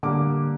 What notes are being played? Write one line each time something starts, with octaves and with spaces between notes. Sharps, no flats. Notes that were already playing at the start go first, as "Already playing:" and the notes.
D3 G3 A#3 D6